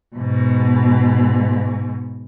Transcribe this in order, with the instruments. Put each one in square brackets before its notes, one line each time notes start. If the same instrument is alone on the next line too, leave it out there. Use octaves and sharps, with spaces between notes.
[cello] G#2 B2